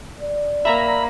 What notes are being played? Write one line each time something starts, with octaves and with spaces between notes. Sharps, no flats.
D5
A#3 E5 A#5 B5